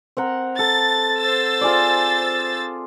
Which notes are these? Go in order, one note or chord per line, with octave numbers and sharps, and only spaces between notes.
C4 A#4 F#5
A4 A6
C5 E6 A6
F4 G#4 D5